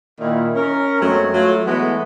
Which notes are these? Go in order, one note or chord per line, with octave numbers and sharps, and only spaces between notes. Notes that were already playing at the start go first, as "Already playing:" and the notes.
A#2 D#3 E4
C#4 A#4
F#2 F#3 G#3 A3 B3 C4
F#3 A3 F4
E3 G#3 A3 B3